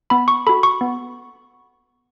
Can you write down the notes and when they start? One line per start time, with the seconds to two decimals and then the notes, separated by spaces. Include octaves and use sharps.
0.10 B3 B5
0.28 C#6
0.47 F#4 A4 B5
0.63 C#6
0.81 B3